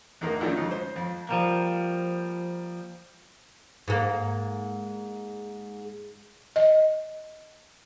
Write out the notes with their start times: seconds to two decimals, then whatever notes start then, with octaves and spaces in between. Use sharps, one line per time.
0.21 E2 A2 A#3 D#4 A#4
0.40 D3 D#3 F3 F#3 A3 C#4
0.56 F2 G#2 D#4
0.71 C5
0.96 F2
1.29 F3 G3 A#3
3.88 G#2 A#3
6.56 D#5